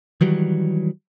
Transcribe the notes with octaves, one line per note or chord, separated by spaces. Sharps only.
D#3 E3 F#3 G3